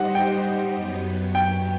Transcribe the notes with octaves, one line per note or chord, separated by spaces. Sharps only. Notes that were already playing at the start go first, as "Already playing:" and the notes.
Already playing: G3 D#4 G4 C5 D#5 F#5
G5
F#2 F#3 B3
G5